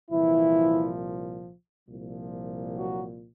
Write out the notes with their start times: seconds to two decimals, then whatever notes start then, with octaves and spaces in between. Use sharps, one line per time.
0.11 C2 A#2 E3 F3 E4
1.88 C2 A#2 F3
2.76 F#3 F#4